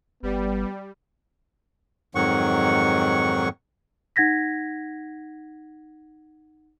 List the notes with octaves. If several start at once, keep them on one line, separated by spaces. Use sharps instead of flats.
G1 G3 B3
F2 G#2 D#3 F#3 F#5 C#6
D#4 F#5 G#6 A#6 B6